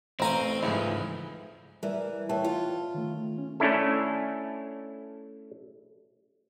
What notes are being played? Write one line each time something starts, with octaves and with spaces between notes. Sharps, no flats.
A1 C4 C5 F5 G#5 A#5
C#2 G#2 F3 E4 G#4 B4
E3 G3 A#4 D5
E3 C#5 G5 A5
F4
D#3 A3
C#4
A3 C#4 D4 E4 A4